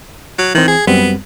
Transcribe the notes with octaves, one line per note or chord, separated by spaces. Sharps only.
F#3
D#3 E3 C4
G#4
F#2 G3 B3 C4